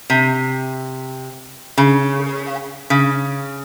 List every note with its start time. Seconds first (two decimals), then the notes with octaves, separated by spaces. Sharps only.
0.10 C3
1.78 C#3
2.90 C#3